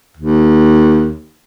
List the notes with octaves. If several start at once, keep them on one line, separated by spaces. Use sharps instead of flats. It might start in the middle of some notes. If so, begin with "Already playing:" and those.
D#2